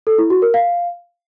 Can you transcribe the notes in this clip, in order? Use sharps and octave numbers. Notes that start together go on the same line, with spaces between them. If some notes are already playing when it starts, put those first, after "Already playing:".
A4
E4
F#4
A#4
F5